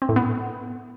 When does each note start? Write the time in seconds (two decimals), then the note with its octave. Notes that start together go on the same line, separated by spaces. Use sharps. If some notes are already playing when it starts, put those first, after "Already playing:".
0.02 C4
0.09 A2
0.16 B3